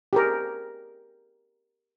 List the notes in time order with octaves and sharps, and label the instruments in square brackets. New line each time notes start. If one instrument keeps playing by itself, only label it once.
[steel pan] G4 G#4 A#4